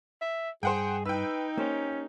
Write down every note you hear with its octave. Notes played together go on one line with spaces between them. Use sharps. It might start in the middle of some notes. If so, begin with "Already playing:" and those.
E5
G2 G#4 C5 F#5 G5
D#4 B4 G5 E6
A#3 C#4 G4 C5